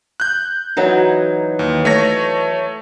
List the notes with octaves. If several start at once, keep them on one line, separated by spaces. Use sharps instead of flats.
F#6 G6
E3 F#3 D#4
D#2
A3 C#5 A#6